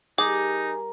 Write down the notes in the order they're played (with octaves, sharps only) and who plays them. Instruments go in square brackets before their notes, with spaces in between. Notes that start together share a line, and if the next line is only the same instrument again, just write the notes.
[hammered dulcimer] G3 A#4 [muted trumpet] D#4 [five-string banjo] G#4 [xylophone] D6